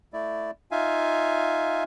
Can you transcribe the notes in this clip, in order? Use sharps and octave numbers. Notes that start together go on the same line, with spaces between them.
A3 E4 D5
D#4 F4 E5 F5 G#5